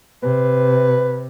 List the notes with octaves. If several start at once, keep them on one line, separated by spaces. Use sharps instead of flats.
C3 B4